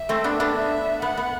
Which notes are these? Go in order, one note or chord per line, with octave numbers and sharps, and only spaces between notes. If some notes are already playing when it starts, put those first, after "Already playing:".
Already playing: E5
A3 C4
B3 D4
B3 D4
E5
B3 F#5
B3